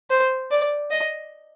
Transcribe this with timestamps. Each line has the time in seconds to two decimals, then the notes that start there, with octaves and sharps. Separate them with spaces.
0.10 C5
0.51 D5
0.90 D#5